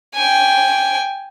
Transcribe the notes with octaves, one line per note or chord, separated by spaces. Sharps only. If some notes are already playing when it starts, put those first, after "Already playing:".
G5 G#5